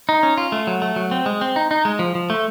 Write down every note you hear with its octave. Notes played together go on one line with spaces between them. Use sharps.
D#4
C#4
F4
A3
F#3
A3
F#3
C4
G#3
C4
D#4
D#4
G#3
F3
F3
A3